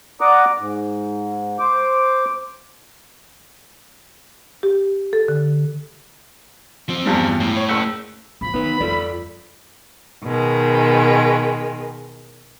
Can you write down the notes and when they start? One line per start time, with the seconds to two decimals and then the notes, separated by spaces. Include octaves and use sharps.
0.21 D5 F#5 A#5 D6 D#6
0.58 G#2
1.59 C5 D6
4.63 G4
5.13 A4
5.28 D3
6.89 F3 C4
7.05 E2 G2 G3
7.40 A2
7.56 C#5
7.68 F#1 E6 C#7
8.41 E3 F3 B5
8.54 D#3 B3 D#4 B4
8.80 F2 F4 A4 D5
10.24 B2 D#3 G#3